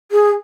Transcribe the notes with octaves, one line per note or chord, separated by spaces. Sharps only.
G#4